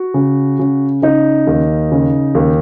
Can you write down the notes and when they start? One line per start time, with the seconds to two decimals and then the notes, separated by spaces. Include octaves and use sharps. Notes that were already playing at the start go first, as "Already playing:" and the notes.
Already playing: F#4
0.14 C#3
0.59 C#3
1.02 C#3 D#4
1.47 D#2
1.92 C#3
2.35 D#2